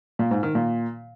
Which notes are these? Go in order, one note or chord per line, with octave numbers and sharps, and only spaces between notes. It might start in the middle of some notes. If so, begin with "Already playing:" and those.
A#2
G#2
D#3
A#2